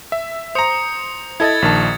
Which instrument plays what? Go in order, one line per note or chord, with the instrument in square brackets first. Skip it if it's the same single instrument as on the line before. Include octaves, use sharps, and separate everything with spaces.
[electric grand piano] E5
[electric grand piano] C5 A#5 [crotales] D#6 C#7
[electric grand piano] E4 A4 D#5 [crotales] G#6 A6
[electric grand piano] A#1 D#3 A5